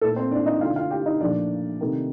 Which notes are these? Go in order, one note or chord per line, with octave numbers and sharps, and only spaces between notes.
A#2 A3 A4
C4 C5
D4 D5
D#4 D#5
D3 A3 F4 F5
F4 F5
G4 G5
D#4 D#5
A#2 F3 A3 D4 D5
C3 D#3 A3